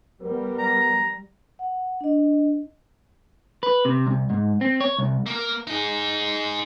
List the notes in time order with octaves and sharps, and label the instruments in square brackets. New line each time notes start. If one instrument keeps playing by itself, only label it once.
[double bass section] G3 [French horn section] B3 A#4
[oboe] A#5
[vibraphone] F#5
D4 D#5
[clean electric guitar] B4
C3
C2
G#2
C4
C#5
C2
[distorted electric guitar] A#3 A#4
D#4 G#4